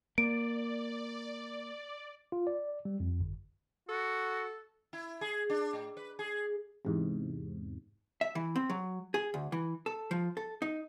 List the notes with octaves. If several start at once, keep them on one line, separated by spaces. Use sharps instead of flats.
A#3 D5 D7
F4
D5
G3
F2
G1
F#4 A4
E4
G#4
D4
A2
B4
G#4
E2 G#2 C3
E5
E3
C4
F#3
G#4
D2
E3
A4
F3
A4
D#4